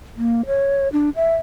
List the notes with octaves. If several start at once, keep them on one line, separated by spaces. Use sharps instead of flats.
A#3
C#5
D4
E5